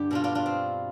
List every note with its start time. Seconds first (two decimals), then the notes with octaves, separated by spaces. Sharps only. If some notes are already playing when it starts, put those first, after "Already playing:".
Already playing: G2 D3 G4
0.11 B2 D4 F4
0.24 D4 F4
0.35 D4 F4
0.46 C4